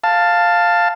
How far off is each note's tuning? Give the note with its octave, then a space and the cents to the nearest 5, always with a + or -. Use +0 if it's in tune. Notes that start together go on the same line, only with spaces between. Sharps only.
F5 +0 A5 +10